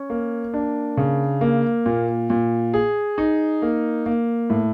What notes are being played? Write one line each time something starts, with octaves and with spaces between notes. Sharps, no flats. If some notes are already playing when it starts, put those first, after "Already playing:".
Already playing: C#4
A#3
D4
C#3
A#3
A#2
A#2
G#4
D#4
A#3
A#3
A2